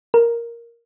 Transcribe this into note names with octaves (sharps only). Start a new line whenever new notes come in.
A#4